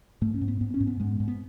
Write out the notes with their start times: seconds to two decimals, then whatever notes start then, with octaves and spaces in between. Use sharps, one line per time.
0.21 G#2 A3
0.34 C#4
0.41 G#2
0.48 B3
0.61 G#2 B3
0.74 C#4
0.80 G#2
0.87 B3
1.00 G#2 G#3
1.20 G#2
1.28 B3